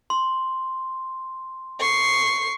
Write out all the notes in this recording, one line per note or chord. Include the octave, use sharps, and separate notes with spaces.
C6
C#6 C7